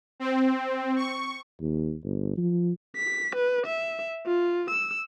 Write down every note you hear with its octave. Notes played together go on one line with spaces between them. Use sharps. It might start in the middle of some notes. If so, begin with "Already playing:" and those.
C4
C#6
D#2
G1
F3
B6
B4
E5
F4
E6